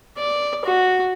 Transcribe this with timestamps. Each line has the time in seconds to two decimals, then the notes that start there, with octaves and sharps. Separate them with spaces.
0.17 D5
0.65 F#4